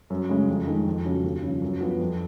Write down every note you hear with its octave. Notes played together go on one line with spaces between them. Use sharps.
F#2
C#3 G#3
F2
D#3 G#3
F2
C#3 F#3 C#4
D#2
C#3 F3
F#2
F3 B3
F2